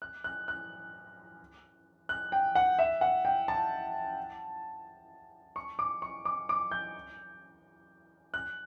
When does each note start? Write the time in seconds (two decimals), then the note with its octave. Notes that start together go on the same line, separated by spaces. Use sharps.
0.02 F#6
0.24 F#6
0.48 F#6
2.09 F#6
2.32 G5
2.55 F#5
2.79 E5
3.01 F#5
3.25 G5
3.48 A5
5.56 C#6
5.79 D6
6.02 C#6
6.25 D6
6.49 D6
6.71 G6
8.34 F#6